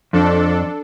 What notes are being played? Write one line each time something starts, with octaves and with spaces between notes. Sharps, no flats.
F2 D4 A4